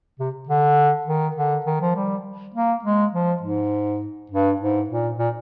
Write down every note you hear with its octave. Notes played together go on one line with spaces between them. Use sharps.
C3
D3
D#3
D3
D#3
F3
G3
A#3
G#3
F3
G#2
G2
G#2
A#2
A#2